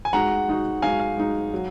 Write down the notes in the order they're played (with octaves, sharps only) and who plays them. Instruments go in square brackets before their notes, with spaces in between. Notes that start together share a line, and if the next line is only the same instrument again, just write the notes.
[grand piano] G#5
[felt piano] G#3 D#4 F#4 [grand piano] F#5 A#5
[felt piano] G#3 D#4 F#4
[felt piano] G#3 D#4 F#4 [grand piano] F5 G#5
[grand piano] F5
[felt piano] G#3 D#4 F#4
F#3